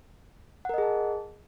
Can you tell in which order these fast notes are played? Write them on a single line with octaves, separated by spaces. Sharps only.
F#5 A#4 D#5 G#4 A5